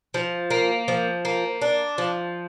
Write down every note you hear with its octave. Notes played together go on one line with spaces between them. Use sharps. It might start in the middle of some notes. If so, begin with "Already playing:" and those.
F3
A#3
F3
A#3
D4
F3